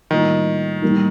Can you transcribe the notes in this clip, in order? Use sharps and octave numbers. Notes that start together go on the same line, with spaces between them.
A2 D#3 G3 A#3 F4
A2 G3 A#3 D#4